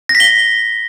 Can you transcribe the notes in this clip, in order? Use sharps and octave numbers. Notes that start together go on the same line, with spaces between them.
A#6
B6
G7